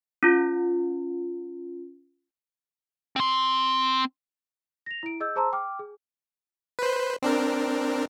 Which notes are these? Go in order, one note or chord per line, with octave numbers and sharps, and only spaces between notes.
C#4 F4
C4 C6
A#6 F7
E4 D7
G#4 D#5 E6 G6
G#4 C5 A5 A#5 C6 E6
G5 D6 F6
G#4
B4 C5
C4 D4 A#4